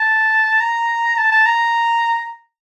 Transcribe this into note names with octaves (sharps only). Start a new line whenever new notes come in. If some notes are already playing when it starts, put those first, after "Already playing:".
Already playing: A5
A#5
A5
A5
A#5